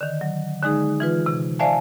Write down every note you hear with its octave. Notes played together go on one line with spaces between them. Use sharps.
D3 D#3
F#3
D3 G#3 D#4 G#4
E3 F4 B4
C3
C5 D5 E5 F5 G#5 A5